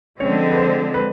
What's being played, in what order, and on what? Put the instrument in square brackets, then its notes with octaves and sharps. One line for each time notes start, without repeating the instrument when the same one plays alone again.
[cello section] D3 F3 G#3 C4 [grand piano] C#4 C#5
[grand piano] B4
C5
B4